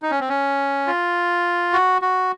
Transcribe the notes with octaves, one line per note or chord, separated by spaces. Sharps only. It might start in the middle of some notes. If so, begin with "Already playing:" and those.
D#4
C#4
C4
C#4
F4
F#4
F#4